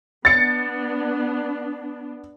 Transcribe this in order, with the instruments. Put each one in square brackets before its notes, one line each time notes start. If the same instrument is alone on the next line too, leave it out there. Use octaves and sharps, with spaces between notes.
[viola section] B3 D4 [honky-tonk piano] A6 C#7